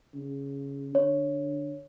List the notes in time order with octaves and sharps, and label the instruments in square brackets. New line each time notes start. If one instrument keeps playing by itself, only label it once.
[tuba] C#3
[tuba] D3 [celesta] C#5